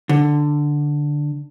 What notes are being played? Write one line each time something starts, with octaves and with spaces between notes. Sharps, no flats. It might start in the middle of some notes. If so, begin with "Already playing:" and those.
D3